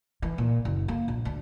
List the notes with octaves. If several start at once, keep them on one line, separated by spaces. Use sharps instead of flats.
E3
A#2
F#1
A#3
A#1
D2